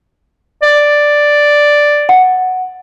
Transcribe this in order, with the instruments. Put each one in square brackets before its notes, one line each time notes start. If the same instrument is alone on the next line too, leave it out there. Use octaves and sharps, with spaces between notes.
[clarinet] D5
[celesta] F#5